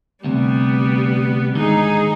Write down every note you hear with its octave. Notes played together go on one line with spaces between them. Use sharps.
D2 C3 G3 B3
D#2 G#2 D3 D#4 G#4